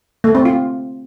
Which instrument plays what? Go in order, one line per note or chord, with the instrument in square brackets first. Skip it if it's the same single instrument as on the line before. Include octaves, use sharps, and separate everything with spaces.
[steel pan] A3
C4
F4